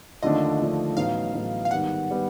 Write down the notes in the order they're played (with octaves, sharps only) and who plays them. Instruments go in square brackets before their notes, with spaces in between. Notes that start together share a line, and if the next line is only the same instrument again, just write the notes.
[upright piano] D#2 D3 F3 A3 D4 [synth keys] D#5
[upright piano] D#2 D3 F3 A3 D4
[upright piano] A1 A2 F#3 B3 D#4 [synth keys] F5
[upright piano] A1 A2 F#3 B3 D#4
[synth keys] F5
[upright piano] G#2 D#3 G3 B3 [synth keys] F#5
[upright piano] D#3 G3 B3